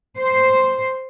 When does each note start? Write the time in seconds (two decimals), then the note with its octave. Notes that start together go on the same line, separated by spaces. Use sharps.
0.17 C5